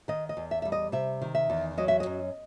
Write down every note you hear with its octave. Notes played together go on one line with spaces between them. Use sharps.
D#3 D#5
D#5
E2
E5
G3 E5
D#5
C3 E5
D#3
E5
E2
F#3 D#5
E5
D#5
F#2